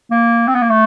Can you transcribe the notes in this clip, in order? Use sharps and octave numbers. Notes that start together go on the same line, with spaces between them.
A#3
C4
B3
A#3
A3